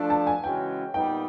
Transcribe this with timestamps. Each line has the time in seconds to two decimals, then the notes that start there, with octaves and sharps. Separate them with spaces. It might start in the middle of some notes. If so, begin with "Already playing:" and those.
Already playing: F3 A3 D4
0.10 A5
0.27 G#5
0.44 C#3 E3 G#3 C#4 F#4 G5
0.94 A#2 G3 B3 D#4 G5